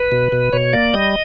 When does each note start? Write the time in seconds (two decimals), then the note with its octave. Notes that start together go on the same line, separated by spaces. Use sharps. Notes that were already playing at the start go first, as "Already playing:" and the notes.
Already playing: B4
0.12 B2
0.32 B2
0.53 B2 C#5
0.73 A#3 D5
0.94 G3 D#5